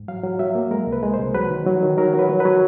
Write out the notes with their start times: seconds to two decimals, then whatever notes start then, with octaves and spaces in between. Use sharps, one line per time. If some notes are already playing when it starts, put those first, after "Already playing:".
Already playing: G#2
0.08 F#3 F5
0.24 F#3
0.39 F#3 E5
0.55 A#3
0.71 G#3 A#4
0.87 C2
0.92 B4
1.03 G#3
1.14 C2 C5
1.35 F#3 B4
1.50 D#3
1.66 F#3
1.82 D#3
1.98 F#3 A#4
2.14 F#3
2.19 B4
2.29 F#3
2.40 F#3 B4